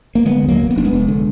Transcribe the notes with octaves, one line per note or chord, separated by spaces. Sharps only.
A#3
D3 G#3 B3
D#2
F#3 A#3
F1
B3
F1 D4
G#3 B3
F1
D3